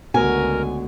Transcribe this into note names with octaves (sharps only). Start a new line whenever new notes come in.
C#2 D3 A3 B3 F#4 A#4 G#5